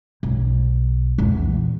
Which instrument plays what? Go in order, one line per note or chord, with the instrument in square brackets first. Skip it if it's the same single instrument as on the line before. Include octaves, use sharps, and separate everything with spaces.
[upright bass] B1
E2 A#2